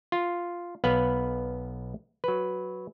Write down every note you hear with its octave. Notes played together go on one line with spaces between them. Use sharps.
F4
B1 B3 B4 F5
F#3 B4